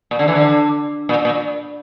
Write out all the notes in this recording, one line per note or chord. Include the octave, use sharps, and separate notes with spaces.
A#2
D3
E3
D3
A#2
A#2